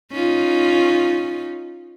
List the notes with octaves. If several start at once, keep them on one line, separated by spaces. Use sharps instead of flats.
C#4 D#4 F4